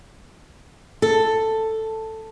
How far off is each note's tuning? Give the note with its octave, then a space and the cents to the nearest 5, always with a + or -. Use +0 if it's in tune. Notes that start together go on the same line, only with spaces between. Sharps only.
A4 +5